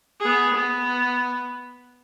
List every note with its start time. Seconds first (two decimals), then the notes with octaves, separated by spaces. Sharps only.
0.20 B3 G#4
0.53 B3